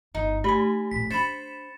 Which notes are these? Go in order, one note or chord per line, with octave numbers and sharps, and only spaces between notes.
G1 D#4
A3 D#4 G4 G#5 B5
A#1 A2 B6
D4 C5 B5 A6 C#7 E7